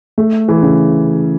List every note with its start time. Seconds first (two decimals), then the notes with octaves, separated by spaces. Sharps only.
0.18 A3
0.48 E3
0.62 C#3